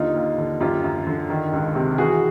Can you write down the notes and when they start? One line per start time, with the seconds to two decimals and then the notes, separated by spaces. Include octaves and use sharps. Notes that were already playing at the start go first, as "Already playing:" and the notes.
Already playing: D#2 D3 D#4 F4
0.15 D#2
0.38 D3
0.60 F#2 F4 G4
0.84 F#2
1.07 D3
1.30 D#3
1.53 C#2
1.75 C3
1.98 E3 F#4 G#4